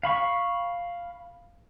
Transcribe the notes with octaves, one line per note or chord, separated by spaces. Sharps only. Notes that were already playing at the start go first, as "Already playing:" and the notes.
F5 B5 C#6